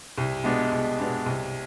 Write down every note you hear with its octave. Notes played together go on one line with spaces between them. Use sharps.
C2
B2 G#3 B3 D4
C2
B2 G#3 B3 D4
C2